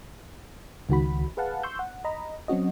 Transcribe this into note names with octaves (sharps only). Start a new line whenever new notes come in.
C#2 D#3 F#4 B5
G#4 B4 F5 F#5 A5
C6 C#6 E6 G6
F#5
D#5 A#5 B5
F#3 C4 C#4 F#4 D#5